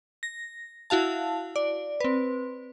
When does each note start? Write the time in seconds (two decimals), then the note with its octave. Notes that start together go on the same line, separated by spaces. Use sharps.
0.23 A#6
0.90 E4 F#4 F5 A5
1.56 D5
2.00 C4 B4